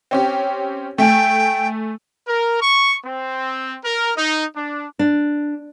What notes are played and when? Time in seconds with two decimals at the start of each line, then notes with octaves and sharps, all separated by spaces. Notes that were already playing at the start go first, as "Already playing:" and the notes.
0.11 C4 C#4 G4
0.98 A3 G5 G#5
2.27 A#4
2.61 C#6
3.05 C4
3.84 A#4
4.17 D#4
4.55 D4
4.99 D4